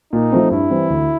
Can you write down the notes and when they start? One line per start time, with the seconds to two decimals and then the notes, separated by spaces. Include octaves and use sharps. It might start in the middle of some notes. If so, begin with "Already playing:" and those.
0.13 A#2 D#4
0.32 F3 A3 C4
0.51 G2 E4
0.70 E3 G3 C4
0.90 D2